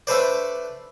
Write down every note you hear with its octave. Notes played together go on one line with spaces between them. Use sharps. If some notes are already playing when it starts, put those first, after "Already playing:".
A3 D4 A4 B4 C5 D5